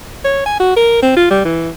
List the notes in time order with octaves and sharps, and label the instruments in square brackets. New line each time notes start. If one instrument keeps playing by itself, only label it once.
[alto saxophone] C#5
G#5
F#4
A#4
C4
F4
G3
E3